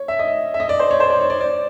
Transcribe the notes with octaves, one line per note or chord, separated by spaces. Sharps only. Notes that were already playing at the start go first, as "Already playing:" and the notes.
Already playing: C#5
E5
D#5
E5
D#5
D5
C5
C#5
C5
D5
C#5
D5
D5